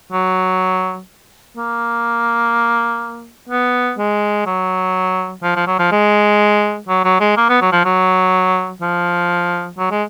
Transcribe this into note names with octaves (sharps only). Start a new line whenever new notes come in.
F#3
A#3
B3
G#3
F#3
F3
F3
F#3
F3
G#3
F#3
F#3
G#3
A#3
B3
F#3
F3
F#3
F3
F#3
G#3